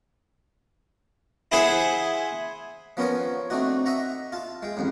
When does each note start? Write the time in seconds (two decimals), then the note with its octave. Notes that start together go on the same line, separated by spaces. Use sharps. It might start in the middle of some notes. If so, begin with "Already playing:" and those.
1.52 E4 G#4 C5 E5 F#5
2.97 F3 B3 C#4 A#4 C5 C#5
3.50 A3 C4 D4 D#4 F#4
3.86 D#5 E5 F#5 A#5
4.32 F4 A5
4.63 G#3 G5
4.77 A1 F2 G#2